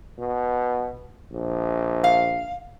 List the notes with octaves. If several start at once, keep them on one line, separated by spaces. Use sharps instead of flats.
B2
A#1
F5